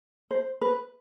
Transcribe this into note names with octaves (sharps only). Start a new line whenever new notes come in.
C5
B4